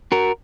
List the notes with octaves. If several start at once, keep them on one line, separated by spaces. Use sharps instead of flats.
F#4 A#4